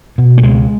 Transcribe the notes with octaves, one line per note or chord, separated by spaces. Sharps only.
B2
A3
C#2 G#3